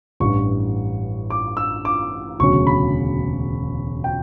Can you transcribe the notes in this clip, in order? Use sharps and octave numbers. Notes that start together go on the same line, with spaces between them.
A1 G2 E3 C#6
D6
E6
D6
E1 D2 C#3 F#3 C#4 C#6
B5
G5